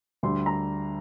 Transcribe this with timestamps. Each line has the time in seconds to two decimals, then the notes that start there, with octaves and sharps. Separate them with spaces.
0.23 D2 D3 G3 C6
0.46 A#5